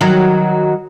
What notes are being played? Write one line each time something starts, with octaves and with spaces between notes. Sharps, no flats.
D#3 F#3